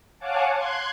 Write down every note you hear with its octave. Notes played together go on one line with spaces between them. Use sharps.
C#5 F5 F#5 G#5 A5 D6
C6 F#6 G#6